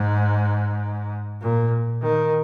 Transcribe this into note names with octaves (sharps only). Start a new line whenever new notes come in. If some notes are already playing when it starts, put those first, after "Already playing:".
Already playing: G#2
A#2
D#3